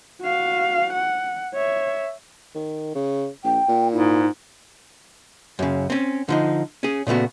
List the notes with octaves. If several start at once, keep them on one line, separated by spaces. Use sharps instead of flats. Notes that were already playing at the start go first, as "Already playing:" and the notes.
F#4 F5
F#5
C#5 E5
D#3
C#3
A#1 G5
A#2
G#2 E4
F#2 C#3
C4 C#4
D3 F3 D#4
C#4 G#4
A#2 C#3 A3 B3 F#4